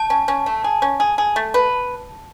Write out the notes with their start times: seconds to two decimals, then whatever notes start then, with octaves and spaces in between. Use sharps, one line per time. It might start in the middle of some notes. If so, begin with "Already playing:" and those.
Already playing: A5
0.10 C#4
0.28 C#4
0.46 A3
0.64 G#4
0.82 C#4
1.00 G#4
1.18 G#4
1.36 A3
1.54 B4